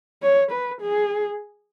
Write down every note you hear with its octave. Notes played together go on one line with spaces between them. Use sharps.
C#5
B4
G#4